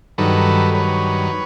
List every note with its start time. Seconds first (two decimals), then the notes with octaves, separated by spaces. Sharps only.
0.18 G2 D#3 F#3 A4 B4
0.75 B4 C#5